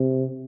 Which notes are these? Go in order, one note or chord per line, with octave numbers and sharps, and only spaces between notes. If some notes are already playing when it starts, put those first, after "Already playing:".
Already playing: C3